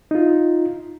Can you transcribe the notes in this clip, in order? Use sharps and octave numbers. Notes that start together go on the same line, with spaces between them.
D#4 F4